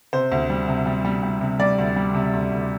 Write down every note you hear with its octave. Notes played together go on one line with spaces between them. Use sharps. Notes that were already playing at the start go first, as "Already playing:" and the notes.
C3 C5
D2
G3
C3
G3
G3
G3
C3
G3 D5
D2
G3
C3
D2
D2